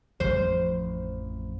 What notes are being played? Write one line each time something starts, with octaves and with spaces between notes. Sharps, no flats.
A1 F2 F3 C5